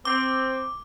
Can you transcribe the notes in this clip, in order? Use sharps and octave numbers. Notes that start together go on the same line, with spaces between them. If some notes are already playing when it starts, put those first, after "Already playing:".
C4 D6